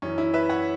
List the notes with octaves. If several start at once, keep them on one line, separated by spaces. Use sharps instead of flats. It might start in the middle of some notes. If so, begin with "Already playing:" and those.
F#2 E3 C#4
E4
B4 E5
C#5 F#5